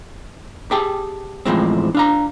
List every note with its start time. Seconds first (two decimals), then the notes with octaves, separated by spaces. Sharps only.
0.71 G4 G#4 G5 A5
1.45 E2 A2 F3 G#3 C4
1.95 D4 F5 A#5